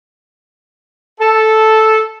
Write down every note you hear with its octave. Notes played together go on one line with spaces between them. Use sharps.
A4